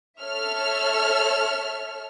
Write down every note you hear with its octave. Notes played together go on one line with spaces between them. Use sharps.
A4 C#5 E5 F6